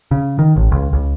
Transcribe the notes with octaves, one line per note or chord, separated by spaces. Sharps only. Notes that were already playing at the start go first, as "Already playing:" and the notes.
C#3
D#3
A1
C#2
C#2